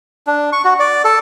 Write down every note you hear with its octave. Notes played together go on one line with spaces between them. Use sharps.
D4
C#6
F#4
D5
A4